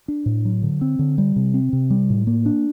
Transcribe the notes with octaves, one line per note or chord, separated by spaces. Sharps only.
D4
A2
F#3
D3
C4
D3
G3
C3
C4
C3
G3
A2
A#3
D4